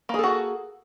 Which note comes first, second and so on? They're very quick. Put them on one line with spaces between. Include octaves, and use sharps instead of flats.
A#3 G#4 A4 F#4